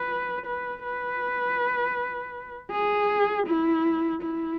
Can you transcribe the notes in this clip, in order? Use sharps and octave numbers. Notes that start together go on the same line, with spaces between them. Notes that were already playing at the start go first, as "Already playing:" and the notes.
Already playing: B4
B4
B4
G#4
E4
E4